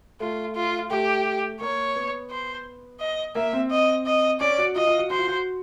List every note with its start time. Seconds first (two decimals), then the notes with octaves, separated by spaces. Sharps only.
0.20 A3 F4
0.55 F4
0.90 A3 G4
1.60 A#3 C#5
1.96 B3
2.31 C5
3.00 D#5
3.35 A#3 E5
3.53 C4
3.71 D#5
4.06 D#5
4.40 C#4 D5
4.58 F#4
4.76 F4 D#5
4.87 F4
4.98 F#4
5.10 F#4 C5
5.19 F4
5.27 F#4